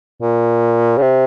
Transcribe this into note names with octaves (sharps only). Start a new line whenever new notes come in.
A#2
C#3
C3